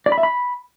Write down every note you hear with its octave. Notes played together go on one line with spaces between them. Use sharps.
D5
B5
E5
B5